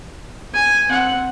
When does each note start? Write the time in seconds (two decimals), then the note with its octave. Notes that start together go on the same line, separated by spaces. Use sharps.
0.54 G#5
0.89 C4 F#5